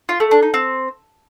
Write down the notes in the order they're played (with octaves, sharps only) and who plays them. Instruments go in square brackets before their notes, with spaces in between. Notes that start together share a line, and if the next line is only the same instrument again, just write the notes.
[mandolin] F4
A3
D4
D#4
C4